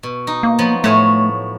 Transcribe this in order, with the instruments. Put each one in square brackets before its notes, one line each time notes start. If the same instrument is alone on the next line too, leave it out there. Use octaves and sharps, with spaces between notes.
[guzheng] B2
D#4
[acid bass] A#3
[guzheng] F3 F#3 B3
[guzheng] A2 C#5 G#5 [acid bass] A3